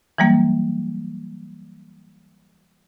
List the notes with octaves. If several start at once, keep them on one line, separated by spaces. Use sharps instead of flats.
E3 F#3 G3 A#3